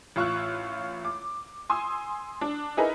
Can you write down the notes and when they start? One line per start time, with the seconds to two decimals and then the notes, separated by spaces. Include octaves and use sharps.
0.16 A1 F4 C#6 E6 F#6
1.04 D6
1.70 G#5 C6 D#6 E6
2.41 D4
2.77 D#4 E4 G#4 A#4 B4 D#5